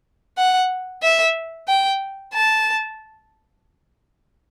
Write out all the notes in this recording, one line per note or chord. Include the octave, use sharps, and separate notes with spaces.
F#5
E5
G5
A5